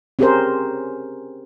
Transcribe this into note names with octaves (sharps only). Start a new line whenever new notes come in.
C4 C#4 G4 G#4 A#4 C5